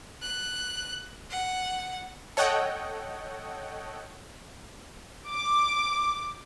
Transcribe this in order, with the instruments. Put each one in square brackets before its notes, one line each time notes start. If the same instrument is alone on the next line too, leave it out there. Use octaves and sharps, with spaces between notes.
[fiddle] F#6
F#5
[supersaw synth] A4 C#5 D#5 F#5 G5
[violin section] D6